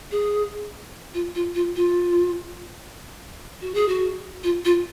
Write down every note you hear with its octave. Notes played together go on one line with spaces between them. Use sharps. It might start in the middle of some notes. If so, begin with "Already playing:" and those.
G#4
F4
F4
F4
F4
F#4
G#4
F#4
F4
F4